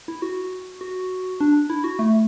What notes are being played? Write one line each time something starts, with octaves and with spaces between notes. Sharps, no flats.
E4
F#4
F#4
D4
E4
F#4
A3